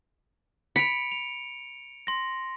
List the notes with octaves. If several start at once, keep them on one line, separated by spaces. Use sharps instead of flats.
B5 C#7 D7 F7
F7
C6 A#6